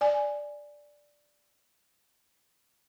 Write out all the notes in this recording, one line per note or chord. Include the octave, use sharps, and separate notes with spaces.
D5 G#5